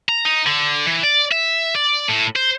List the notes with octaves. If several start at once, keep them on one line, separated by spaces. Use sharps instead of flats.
A#5
D#4
D3
E3
D5
E5
D5
A2
C5